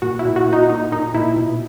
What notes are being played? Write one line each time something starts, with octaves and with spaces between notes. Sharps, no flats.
A#2 F#4
E4
A#2
F#4
A#2
D#4
A#2 D#4
A#2 D#4
A#2 E4
B2